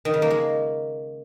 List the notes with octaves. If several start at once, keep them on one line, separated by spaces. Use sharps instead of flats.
D#3
C#3
A#3
G#3